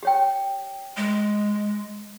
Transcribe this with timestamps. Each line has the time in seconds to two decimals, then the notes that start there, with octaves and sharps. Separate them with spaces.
0.03 G4 C#5 G5
0.97 G#3